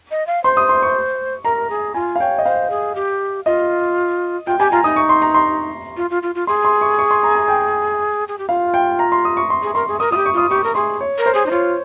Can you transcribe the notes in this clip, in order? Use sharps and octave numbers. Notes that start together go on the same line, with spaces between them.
D#5
F5
C5 C6
D#6
C6
C#6
A#4 A#5
G#4
F4 G#5
F5
C#5 G5
D#5
C5 F5
G#4
G4
F4 D#5
F4 G5
G4 G#5
F4 A#5
D#4 D#6
C#6
C6
A#5
C6
F4
F4
F4
F4
G#4 C6
C6
C#6
C#6
C6
A#5
G#5
G5
G#4
G4
F4 F5
G5
A#5
C6
D#6
C#6
C6
G#4
A#4 C6
G#4
A#4 D#6
F4 G4 D#6
C#6
F4 D#6
G4 C#6
A#4
G#4 C6
C#5
A#4
C5
G#4
D#4
F4 C#5